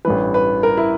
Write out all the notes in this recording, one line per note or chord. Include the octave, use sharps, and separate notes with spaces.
A1 G2 E3 B4
B4
A#4
E4